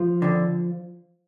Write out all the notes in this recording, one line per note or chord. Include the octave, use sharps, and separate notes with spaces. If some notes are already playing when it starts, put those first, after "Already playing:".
Already playing: F3 F4
F2 D3